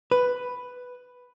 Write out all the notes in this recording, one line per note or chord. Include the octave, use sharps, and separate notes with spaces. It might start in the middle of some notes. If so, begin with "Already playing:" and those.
B4